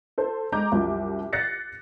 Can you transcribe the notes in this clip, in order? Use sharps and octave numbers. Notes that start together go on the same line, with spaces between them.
A4 C5
G#3 D#5 A#5 D6 G6
C2 F#2 F3
F#6 A6 A#6 C7 C#7